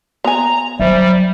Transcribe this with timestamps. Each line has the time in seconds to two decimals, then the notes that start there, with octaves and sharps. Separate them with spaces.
0.24 B3 G#5 A#5
0.80 F#3 G3 C5 E5